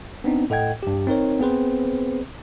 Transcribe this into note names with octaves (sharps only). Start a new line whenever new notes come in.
B3 C4 D4 D#4
A2 A4 D#5 F#5 G5 G#6
G2 G4
C4 D#4 A#4 C#5
B3 C4 G#4 B4 C5